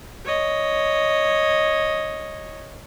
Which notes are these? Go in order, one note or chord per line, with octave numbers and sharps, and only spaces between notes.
C#5 D#5